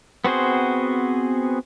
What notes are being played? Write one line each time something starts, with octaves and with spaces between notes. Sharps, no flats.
B3 C4 F#4 G#4 C5